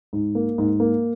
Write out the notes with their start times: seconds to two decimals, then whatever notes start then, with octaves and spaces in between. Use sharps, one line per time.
0.13 G#2
0.35 A#3
0.58 G#2
0.80 A#3